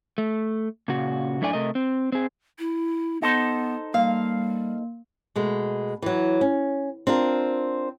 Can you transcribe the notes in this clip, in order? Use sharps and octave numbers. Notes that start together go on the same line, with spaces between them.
A3
A#2 C#3 F#4
F#2 A2 A3 D4 D5 G#5
C3 A3 A#4 D#5
C4
C4 G#4
E4
B3 D#4 A4 C5
G3 A#3 F5
B2 G#3 A3
E3 F#3
C#4
C4 D4 F4 A#4